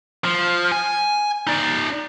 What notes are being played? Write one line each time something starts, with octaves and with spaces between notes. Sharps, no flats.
F3
G#5
D#4 D5